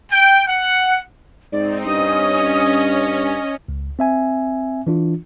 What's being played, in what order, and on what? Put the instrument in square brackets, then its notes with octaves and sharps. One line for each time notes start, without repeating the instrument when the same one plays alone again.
[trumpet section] G5
F#5
[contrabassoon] G#2 [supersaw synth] C4 D#4 [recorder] D5
[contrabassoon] G2 [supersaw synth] C#4 [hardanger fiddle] D#5 [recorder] D#6
[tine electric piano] C#2
C4 E5 G#5
E3 D4 F4